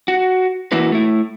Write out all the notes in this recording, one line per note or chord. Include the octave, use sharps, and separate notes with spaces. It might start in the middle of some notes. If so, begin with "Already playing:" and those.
F#4
E3 A#3 E4 F#4 B4
A3 E4